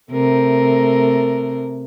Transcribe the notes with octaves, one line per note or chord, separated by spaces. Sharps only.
C3 A3 A#4